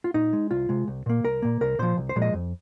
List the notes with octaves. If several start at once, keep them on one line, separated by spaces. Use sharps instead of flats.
F4
A#2 D#4
G#3
C2 F4
C3 G#3
C2
A#2 A#3
C2 A#4
A#2 A#3
C2 A#4
A#2 F3 C5
C2
C5
A#2 F3 G#3
D#5
F2